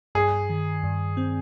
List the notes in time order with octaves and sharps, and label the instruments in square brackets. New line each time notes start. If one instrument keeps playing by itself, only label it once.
[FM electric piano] G2 [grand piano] G#4
[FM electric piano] D#3
G2
C4